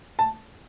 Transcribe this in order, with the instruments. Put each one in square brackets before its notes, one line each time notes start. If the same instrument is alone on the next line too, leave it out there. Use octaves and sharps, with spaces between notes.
[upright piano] A5